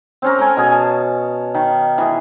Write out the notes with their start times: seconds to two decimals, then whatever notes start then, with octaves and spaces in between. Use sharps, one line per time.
0.22 C4 C#4 A#4
0.38 A4 A#4 C#5 G#5
0.57 B2 G#4 G#5
0.72 A5
1.54 D#3
1.98 E3 G#4